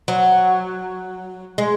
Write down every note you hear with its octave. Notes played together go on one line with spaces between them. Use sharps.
F#3
G#3